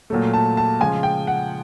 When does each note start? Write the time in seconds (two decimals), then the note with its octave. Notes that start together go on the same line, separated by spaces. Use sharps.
0.10 A#2 F#3 A3
0.34 A5
0.57 A5
0.80 C#3 F3 G#3 G#5
1.03 G5
1.27 F#5